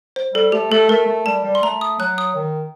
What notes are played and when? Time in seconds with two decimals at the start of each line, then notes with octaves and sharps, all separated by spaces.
0.16 C5
0.34 G3 A4
0.52 A3 G4
0.71 A3 A4
0.89 A3 A#4
1.07 A3
1.26 G3 A5
1.44 G3
1.55 C6
1.62 A3 A#5
1.81 D#6
1.99 F#3 F#6
2.18 D#6
2.36 D#3